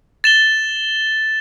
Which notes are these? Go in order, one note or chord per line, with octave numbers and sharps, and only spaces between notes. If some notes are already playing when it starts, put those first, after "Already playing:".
A6 E7 G7